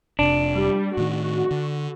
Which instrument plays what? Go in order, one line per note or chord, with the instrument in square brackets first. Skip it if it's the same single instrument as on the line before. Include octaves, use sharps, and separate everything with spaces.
[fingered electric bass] F1 C3 [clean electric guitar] D4
[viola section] G3
[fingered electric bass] A2 D#3 [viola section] F#4
[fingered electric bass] D3